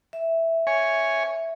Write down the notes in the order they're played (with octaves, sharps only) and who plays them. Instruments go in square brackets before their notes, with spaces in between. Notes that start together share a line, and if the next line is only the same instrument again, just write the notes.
[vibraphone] E5
[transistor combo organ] C#5 G#5